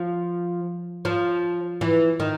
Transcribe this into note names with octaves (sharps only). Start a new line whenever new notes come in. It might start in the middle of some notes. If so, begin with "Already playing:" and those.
Already playing: F3
F3
E3
D#3